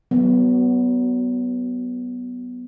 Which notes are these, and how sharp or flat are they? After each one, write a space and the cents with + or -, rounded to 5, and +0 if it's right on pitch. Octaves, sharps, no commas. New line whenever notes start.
F#3 +30 B3 +0